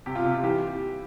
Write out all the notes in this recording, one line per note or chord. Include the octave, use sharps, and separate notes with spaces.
C3 G4
F4
C3 G4
F4
E3 G4